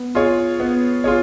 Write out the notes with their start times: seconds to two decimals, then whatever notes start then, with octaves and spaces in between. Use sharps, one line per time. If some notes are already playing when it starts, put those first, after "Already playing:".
Already playing: B3
0.15 F4 G#4 C#5
0.60 B3
1.04 F4 G#4 C#5